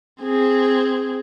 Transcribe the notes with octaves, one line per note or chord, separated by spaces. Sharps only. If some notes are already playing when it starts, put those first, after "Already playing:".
C4 G#4